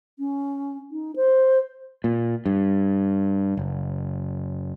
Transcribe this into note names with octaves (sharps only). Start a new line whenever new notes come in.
C#4
D#4
C5
A#2
G2
F#1